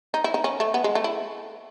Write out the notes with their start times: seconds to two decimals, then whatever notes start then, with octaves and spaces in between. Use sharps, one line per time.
0.14 D#4
0.24 E4
0.34 D#4
0.44 C#4
0.60 A3
0.74 B3
0.84 G#3
0.95 A3
1.04 E4